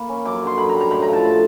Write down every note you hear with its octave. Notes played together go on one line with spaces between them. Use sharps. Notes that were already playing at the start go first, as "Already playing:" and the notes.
Already playing: A#3 B5
C#4
F#2 D6
D3 C6
F#2 B5
G3 A#5
A#5
A2 B5
A#5
F3
A5
A2